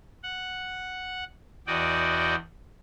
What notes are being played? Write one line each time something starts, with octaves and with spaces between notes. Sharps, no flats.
F#5
E2 F#4 D5 D#5 G5